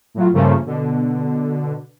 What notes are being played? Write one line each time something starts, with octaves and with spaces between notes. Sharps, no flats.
A2 F#3 F4
G2 C#3 F3 A3 A#3 C#4
B2 D3